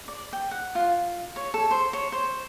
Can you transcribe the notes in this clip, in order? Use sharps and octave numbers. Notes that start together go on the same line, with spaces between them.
D5
G5
F#5
F4
C#5
A4
C5
C#5
C5